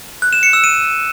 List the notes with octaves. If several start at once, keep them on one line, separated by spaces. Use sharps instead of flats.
F#6
E7
C#7
E6
D#7